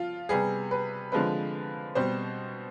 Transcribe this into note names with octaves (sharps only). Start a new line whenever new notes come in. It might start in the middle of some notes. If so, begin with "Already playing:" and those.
Already playing: F3 F4
C3 G3 B3 G#4
B4
D3 F3 G#3 C4 B4
B2 G3 C4 C5